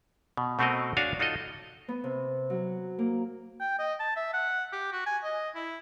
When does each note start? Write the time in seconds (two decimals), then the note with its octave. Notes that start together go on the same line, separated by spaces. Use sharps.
0.37 B2
0.59 B2 A3 C4 F#4 A#4 D#5
0.97 D4 F#4 C#5 F5 G#5
1.19 D#4 F4 F#4 A4 D#5
1.88 B3
2.04 C3
2.50 F#3
2.99 A#3
3.60 G5
3.79 D#5
4.00 A5
4.16 E5
4.33 F#5
4.73 G4
4.92 F#4
5.06 G#5
5.24 D#5
5.55 E4